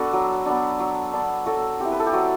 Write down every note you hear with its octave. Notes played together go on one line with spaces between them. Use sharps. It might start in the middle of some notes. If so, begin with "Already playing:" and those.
Already playing: B3 D4 F#4 A4 B4
F#3
B3 D4
F#3
B3 D4
F#3 F#4 A4
C4 E4 G4
B4
A4
G4
F#3 F#4